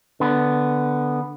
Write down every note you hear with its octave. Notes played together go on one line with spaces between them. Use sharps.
D3 B3